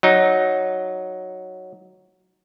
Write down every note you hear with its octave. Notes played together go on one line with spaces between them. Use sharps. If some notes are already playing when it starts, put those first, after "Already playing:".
F#3 D#4